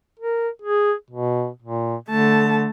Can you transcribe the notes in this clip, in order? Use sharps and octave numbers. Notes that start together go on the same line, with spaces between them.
A#4
G#4
B2
A#2
D3 A3 A5